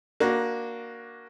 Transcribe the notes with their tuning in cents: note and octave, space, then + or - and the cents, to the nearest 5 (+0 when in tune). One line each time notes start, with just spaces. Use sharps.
A#3 +10 D4 +0 F#4 +0